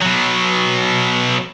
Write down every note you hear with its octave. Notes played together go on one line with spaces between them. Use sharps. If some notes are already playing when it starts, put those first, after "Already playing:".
B2 F#3